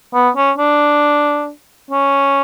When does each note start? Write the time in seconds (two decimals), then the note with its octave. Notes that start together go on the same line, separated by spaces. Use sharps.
0.14 B3
0.36 C#4
0.58 D4
1.91 C#4